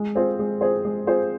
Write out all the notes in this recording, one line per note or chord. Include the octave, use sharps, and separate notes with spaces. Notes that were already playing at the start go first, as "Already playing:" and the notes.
Already playing: G#3
C4 F4 G#4 C5
G#3
C4 F4 G#4 C5
G#3
C4 F4 G#4 C5